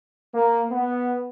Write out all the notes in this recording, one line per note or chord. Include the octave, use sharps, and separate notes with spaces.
A#3
B3